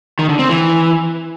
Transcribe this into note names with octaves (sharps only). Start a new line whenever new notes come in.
D#3
D3
C4
E3